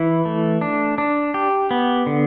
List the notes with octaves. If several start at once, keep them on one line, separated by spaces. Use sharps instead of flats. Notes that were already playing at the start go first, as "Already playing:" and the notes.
Already playing: E3 E4
A3
D4
D4
G4
B3
D3